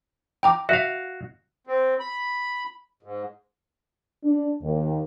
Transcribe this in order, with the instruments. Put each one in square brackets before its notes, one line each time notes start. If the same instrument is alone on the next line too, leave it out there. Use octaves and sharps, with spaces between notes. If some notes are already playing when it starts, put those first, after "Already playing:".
[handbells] G5 A#5 D6
[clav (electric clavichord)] F#4 F5 [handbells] E5
[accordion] C4
B5
G#2
[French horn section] D4
D#2